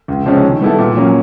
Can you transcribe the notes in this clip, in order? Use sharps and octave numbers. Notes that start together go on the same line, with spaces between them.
C#2
C3 F3 G#3 C#4
D#3
G3 B3 E4 A4
A#2
F#3 A#3 C#4